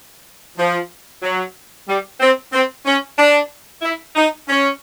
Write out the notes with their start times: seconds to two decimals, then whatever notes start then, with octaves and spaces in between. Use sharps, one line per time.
0.57 F3
1.23 F#3
1.88 G3
2.20 C4
2.52 C4
2.85 C#4
3.18 D4
3.82 E4
4.16 D#4
4.48 C#4